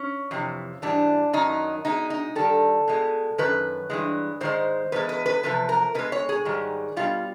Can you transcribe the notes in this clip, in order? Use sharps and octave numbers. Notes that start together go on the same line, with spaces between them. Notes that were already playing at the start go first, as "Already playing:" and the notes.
Already playing: C#4
F2 C3 E3
G#2 E3 G3 D4
F#2 D#3 F#3 D#4
B2 G#3 D#4
D#4
G2 D#3 G3 A4
B2 G#3
F#2 D#3 B4
G2 E3 G#3
G#2 D#3 G#3 C5
E2 B2 G#3 B4
B4
B4
E2 C3 F3 B4
A#4
B2 G#3 B4
C#5
G#4
G#2 D#3 G3
B2 G3 F4